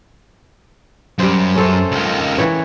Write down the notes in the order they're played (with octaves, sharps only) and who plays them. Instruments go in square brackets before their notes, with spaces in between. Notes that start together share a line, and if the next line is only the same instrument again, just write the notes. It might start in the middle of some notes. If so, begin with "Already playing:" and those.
[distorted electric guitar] F#2 [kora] G3 C5
[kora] C#4 A4 C5
[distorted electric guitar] C#2 D#3
[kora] E3 C#5